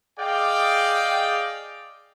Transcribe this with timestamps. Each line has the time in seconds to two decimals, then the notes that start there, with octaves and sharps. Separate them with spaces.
0.18 G#4 D5 D#5 F5 G5